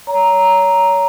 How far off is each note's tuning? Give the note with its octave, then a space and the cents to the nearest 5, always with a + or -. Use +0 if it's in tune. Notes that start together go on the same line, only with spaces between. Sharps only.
C#5 +25 A#5 +0